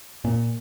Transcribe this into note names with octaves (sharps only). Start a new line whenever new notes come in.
A#2